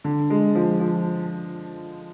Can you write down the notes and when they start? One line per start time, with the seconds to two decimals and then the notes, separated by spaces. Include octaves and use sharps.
0.04 D3
0.30 G#3
0.55 F3
0.80 F3